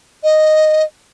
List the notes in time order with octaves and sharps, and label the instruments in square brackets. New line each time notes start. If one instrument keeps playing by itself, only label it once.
[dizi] D#5